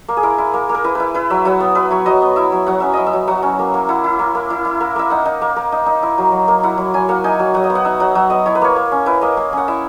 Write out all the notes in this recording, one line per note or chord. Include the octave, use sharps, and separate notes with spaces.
A#3
G#4
E4 A#4
E4
A#3
A#3
A#4
E4 B4
E4 B4
E4 B4
F#3 E5
F#3 F#5
B3
E4 B4
F#3 C#5
F#3 D#5
B3
E4 E5
F#3
F#3 F#5
C#4 E5
E4 D#5
E5
F#3
F#3 F#5
C#4
A#3
A#3
E4 F#5
E4
A#3
A#3
E4
E4
A#3
A#3 E5
D#4 F#5
D#4
A#3
A#3
D#4
D#4
E4
F#3
F#3
A#3
E4 F#5
F#3
F#3 G#5
A#3 F#5
D#4 G#5
F#3
F#3 F#5
D#5
B3
F#5
D#4 E5
F#3 F#5
F#3 F#5
B3 D#5
E4 C#5
B4
A#3 C#5
A#3
C#4
E4 B4
A#3 D#5
A#3
C#4 F#5
E4 E5